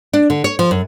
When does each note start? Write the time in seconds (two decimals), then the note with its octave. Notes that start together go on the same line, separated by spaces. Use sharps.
0.13 D4
0.30 D3
0.44 C#5
0.59 F3
0.71 F#2